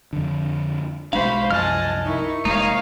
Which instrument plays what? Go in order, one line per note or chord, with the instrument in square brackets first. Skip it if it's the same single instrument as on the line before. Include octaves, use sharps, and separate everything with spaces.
[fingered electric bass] F2 D3
[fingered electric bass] B1 G#3 D4 [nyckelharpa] F#4 [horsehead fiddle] C5 B5 [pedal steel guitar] F5
[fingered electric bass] C2 F#2 F3 [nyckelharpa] D#5 G#5 [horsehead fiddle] A5 [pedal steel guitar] F6 F#6
[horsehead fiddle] D#4 E4 [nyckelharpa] A#4 C#6
[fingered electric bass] F1 G#3 A#3 [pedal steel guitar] D#4 [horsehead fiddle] C#5 F5